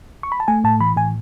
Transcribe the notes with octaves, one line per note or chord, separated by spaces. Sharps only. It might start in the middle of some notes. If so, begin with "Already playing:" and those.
C#6
B5
A5
A3 G#5
A2 A5
E3 B5
A2 G#5